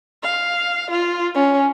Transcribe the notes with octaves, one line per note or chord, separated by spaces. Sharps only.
F5
F4
C#4